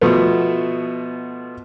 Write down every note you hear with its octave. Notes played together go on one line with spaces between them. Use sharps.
B2 F3 A3 B3